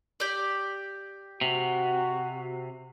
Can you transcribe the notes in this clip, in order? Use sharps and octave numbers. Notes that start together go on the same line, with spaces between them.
G4 D5
C3 F#4